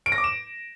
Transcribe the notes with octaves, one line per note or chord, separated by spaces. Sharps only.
D7
A#6
D6
E7